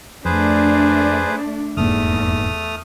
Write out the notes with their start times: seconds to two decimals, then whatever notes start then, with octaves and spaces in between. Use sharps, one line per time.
0.25 F2 A3 D4 G#4 B4 C5
1.77 F1 E2 G#2 A3 A#3 D#6 F6